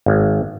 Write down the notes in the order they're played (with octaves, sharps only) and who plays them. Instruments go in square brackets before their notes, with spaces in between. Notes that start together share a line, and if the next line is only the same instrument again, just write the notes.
[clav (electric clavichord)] G#1